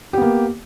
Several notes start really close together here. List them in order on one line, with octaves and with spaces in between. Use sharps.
G4 B3 A#3